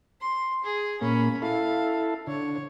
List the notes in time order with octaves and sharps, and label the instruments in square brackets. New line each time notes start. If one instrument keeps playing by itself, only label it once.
[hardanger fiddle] C6
G#4
[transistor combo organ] A#2 A#3 [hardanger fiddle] C#4 B5
[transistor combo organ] E4 A4 [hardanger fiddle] F5
[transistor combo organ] D3 [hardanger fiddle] C#5